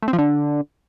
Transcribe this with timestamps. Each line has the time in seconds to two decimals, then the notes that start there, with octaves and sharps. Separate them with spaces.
0.03 A3
0.08 C4
0.13 F3
0.18 D3